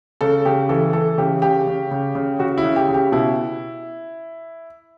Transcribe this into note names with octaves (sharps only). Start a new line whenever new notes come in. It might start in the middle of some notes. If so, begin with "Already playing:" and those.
C#3 A4
C#3 G4
E3 A4
E3 A4
C#3 G4
C#3 G4
C#3
C#3
C#3
C#3 F#4
E4
C#3
G4
C#3
G4
B2 E4